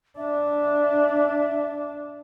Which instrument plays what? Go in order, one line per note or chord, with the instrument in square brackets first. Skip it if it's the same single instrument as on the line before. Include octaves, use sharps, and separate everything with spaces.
[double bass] D4 [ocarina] E5